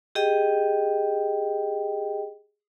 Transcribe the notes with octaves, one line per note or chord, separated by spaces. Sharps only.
G4 G#4 D#5 G5